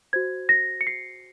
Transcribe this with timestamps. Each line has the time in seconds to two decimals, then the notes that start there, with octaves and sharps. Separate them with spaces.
0.13 F#4 C5 G#6
0.49 A#6
0.81 C#7
0.87 C7